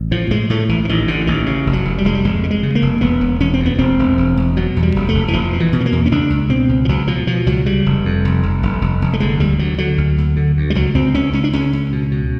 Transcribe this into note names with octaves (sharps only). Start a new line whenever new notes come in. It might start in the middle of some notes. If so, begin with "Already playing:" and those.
Already playing: A1
A2 F3
A2 G#3
A2 A3
A1 E3
E3
A1 D#3
A2 D3
A1 D#3
C#3
F1
F#3
F1
G3
F1 G#3
G3
F1 G#3
C#3
G#3
C#3
A#3
F1
E1 B3
E1
E1 C#4
C4
D2
B3
E1 C4
E1
E1
E1
B2 F#3
E2
G3
F1
A3
F1
E3
F1 F3
B2
E3
B2
B3
A#3
E2
C#4
C#2 D4
C#2
B2 C4
C#2
F3
C#2 F#3
B2 F3
B2 F3
C#2 F#3
C#3 G3
F1
F2
F1
F1
F1
F1
F1
A3
D3 G#3
D2 G3
D2 F#3
D3 F#3
D2
D2
D3
D2
G3
C#2 F#3
C#2 C4
C#2 C#4
C#2 C#4
D4
C#2 C#4
C#2
B2
B2